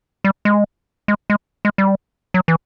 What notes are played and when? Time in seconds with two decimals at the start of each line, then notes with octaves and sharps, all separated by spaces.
0.24 G3
0.45 G#3
1.08 G#3
1.30 G#3
1.65 G#3
1.78 G3
2.34 F#3
2.48 E3